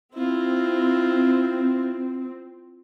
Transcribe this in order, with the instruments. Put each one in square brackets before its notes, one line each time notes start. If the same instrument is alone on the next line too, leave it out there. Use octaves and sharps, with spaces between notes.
[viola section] C4 [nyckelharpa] E4 F4